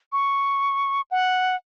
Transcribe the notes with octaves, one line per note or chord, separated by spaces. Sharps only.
C#6
F#5